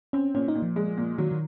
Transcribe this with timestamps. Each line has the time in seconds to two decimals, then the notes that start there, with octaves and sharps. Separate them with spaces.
0.13 C4 C#4
0.35 A#2 C#4
0.48 D#4
0.55 A#2
0.62 F3
0.76 G#3
0.97 A#2
1.18 D#3 F#3
1.32 D#3